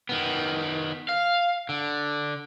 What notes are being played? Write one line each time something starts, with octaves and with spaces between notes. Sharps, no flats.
D#3 B3
F5
D3